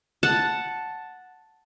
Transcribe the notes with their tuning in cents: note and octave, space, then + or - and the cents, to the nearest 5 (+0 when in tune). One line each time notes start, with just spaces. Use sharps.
F#5 -5 A5 +0